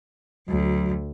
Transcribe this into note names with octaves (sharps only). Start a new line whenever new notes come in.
D2 F#3